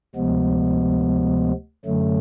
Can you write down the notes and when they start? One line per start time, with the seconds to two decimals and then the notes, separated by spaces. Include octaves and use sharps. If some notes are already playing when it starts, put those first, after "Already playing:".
0.15 D2 C3 F3 G#3 B3
1.85 F#2 D3 F#3 A3